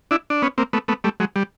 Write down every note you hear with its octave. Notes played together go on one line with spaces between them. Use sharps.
D4 E4
D4
B3 C#4
A#3 C4
A3 B3
A3 B3
G3 A3
F#3 G#3
G3